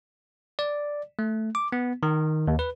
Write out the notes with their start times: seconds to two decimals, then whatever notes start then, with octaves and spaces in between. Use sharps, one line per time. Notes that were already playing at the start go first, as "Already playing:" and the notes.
0.59 D5
1.19 A3
1.55 D6
1.72 B3
2.03 D#3
2.48 D#2
2.59 B4